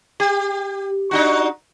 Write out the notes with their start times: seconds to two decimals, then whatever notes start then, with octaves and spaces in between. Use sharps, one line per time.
0.20 G4
1.11 D4 D#4 F#4